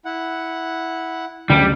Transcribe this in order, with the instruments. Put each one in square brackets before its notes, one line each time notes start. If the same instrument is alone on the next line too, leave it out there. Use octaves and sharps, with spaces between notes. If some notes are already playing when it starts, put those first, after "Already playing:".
[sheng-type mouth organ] E4 F#5
[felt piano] F#1 D2 [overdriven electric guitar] G3